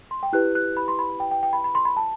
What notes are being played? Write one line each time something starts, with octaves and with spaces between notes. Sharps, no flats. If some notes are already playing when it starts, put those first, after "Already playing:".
C6
G5
E4 G4 B4 F#6
F#6
B5
C6
B5
B5
G5
G5
G5
B5
B5
C6
B5
A5